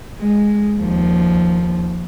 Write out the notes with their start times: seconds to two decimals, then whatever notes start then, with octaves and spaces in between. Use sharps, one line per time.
0.19 G#3
0.79 D#2 F3